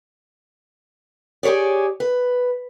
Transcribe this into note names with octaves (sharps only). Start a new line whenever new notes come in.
G4 G#4 B4 C#5 D5
B4